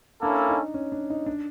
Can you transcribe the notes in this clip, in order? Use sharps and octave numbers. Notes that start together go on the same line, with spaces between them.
A#3 C#4 D4 E4 A4
D#4
C#4
D4
D#4
D4